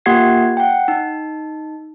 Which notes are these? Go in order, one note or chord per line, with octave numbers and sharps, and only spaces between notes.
A#3 F4 G4 F#5 G#6 C7
F#5 G5
D#4